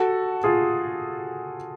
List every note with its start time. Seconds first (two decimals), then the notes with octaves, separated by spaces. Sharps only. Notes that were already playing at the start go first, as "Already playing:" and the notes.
Already playing: F#4 A4
0.44 F4 G#4